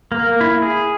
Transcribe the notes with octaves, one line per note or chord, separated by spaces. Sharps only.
A#3
E4
G#4